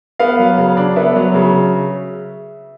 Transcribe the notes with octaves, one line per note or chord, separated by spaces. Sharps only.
B3 F5
F#3
C#3
D4
B3 E5
F#3
C#3